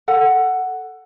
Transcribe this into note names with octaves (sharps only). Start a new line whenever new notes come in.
A4 F#5